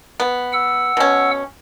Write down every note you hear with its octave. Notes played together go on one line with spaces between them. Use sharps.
B3
F#5 E6
B2 C#4